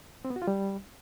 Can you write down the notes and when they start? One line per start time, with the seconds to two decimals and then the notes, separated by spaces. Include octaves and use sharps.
0.25 C4
0.30 B3
0.36 F#4
0.42 F4
0.48 G3